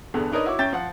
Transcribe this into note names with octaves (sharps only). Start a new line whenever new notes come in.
E2 G2 D3 B3 G#4 A4
D4 D#4 A#4 B4 C#5 D#5
E4 F#4 C#5 D6
F#2 C#4 E5 G5 G6 A6
F3 F#5